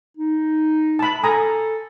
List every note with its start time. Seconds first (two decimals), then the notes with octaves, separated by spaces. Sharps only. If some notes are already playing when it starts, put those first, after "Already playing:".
0.17 D#4
0.99 A5 B5
1.24 A4 G#5 A#5 D#6